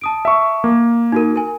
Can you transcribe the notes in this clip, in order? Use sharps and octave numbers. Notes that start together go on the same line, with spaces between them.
A5 D#6 D7
E5 C#6
A#3
D#4 F#4 A#4
A#4 G#5